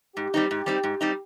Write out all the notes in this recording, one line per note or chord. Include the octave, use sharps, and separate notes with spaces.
G#2 G4
G3 C4 D#4
G#2
G3 C4 D#4
G#2
G3 C4 D#4